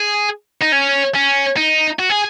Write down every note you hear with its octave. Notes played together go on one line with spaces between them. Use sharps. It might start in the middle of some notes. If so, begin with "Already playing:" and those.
Already playing: G#4
D#4
C#4
C#4
D#4
F#4
G#4